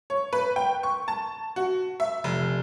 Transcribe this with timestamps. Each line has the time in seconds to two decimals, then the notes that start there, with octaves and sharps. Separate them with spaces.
0.10 C#5
0.33 B4
0.56 G5
0.83 C#6
1.08 A5
1.56 F#4
2.00 E5
2.24 F1